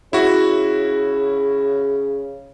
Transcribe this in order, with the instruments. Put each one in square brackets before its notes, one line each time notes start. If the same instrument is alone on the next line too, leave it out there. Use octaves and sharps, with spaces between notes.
[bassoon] C#3 [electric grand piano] E4 F#4